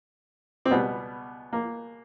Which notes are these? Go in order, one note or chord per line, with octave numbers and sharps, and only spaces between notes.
C4
C#2 B2 G3 B3
A#3